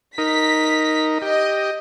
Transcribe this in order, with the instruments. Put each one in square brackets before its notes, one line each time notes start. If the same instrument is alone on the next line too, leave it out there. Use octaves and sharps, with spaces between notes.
[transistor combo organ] D#4 A#4 [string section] B6
[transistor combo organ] G4 [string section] D#5